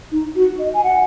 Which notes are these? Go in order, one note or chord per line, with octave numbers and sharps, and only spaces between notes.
D#4
F#4
D#5
G#5
F#5